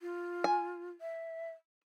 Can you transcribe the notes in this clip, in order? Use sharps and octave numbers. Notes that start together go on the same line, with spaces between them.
F4
G#5
E5